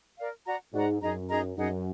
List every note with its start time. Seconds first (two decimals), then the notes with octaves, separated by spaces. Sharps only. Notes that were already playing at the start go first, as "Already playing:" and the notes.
0.17 A#4 D5 F5
0.45 F#4 D5 F#5 A#5
0.73 G#2 F#4 D5 F#5 A#5
1.01 F#2 D#4 G#4 D#5 A#5
1.29 D#4 G#4 D#5 A#5
1.57 F#2 D#4 G#4 D#5 F#5